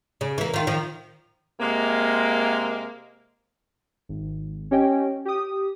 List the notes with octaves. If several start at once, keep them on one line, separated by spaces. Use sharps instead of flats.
C#3
E3 A#3
D#3 F4
D#3 F3
C3 G#3 A#3
G#1
C#4 G4 C#5 D#5 G5
G4 D#6